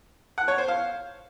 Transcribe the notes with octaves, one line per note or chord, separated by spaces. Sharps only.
F#5
C#5
C5
F5